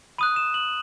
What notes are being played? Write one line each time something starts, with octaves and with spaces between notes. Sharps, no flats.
B5 D#6 F#6 D#7
E7
F#7